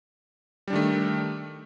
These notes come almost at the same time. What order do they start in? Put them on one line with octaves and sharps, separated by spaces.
G3 D4 D#3 A3